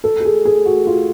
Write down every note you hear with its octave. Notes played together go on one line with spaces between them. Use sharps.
A4
A4
G#4
G#4
F#4
F4